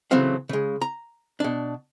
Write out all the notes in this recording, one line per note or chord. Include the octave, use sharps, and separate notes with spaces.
A2 C#3 E3 F#3 C4 F5
C#3 G#3
A#5
B2 D4